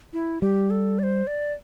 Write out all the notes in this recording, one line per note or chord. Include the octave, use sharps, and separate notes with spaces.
E4
G3 G4
A4
D5
C5
D5